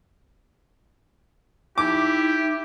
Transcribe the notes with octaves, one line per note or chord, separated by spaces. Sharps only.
D#4 E4 G4 D6